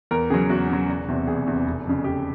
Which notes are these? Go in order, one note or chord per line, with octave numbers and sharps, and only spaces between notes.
E2 A#4
C#3 F#3 G#4
E2 F#4
C#3 F#3
E1
E2 C3
E1 G#4
E2 C3
F1
F2 C#3
F1 G4